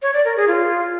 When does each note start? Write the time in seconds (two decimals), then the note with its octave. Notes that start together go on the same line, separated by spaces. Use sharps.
0.02 C#5
0.14 D5
0.25 A#4
0.36 G#4
0.48 F4